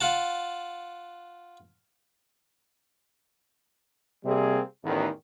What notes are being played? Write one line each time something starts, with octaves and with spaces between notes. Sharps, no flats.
F4 F#5 A5
C3 G3 A#3 C4 G#4
A1 E2 D#3